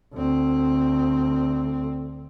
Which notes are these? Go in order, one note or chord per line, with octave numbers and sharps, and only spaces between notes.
D2 C4